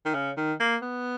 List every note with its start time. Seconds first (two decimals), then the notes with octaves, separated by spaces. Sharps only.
0.05 D#3
0.15 C#3
0.37 D#3
0.60 A#3
0.82 B3